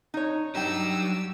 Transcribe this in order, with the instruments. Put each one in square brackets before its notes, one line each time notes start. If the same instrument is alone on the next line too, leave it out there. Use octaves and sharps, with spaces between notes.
[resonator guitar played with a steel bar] D#4 C#5
[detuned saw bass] F#3 [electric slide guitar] G3 D4 [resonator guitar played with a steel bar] D#4 G5 [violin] E6